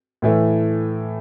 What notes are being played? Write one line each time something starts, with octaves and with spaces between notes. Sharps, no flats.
A2 E3 A3